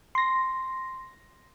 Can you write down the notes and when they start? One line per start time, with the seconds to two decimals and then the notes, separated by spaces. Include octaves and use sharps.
0.15 C6 A#6